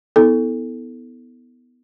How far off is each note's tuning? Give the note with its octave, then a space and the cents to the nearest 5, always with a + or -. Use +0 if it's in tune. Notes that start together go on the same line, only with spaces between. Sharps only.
B3 +5 E4 -35 A4 +0